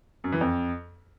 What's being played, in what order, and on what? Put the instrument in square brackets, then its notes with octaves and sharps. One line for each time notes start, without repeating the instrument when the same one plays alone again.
[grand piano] F#2
E3
F2